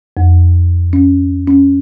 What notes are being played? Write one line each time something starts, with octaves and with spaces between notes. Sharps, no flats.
F2
C#4
C#4